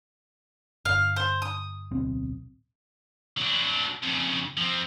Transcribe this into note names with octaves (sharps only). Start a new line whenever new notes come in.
G1 F5
C5
D#6
D1 B1 C4
F#3 D4
F2 C#3
F3 C4